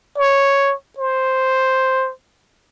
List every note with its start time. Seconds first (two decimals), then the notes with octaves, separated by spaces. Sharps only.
0.18 C#5
0.98 C5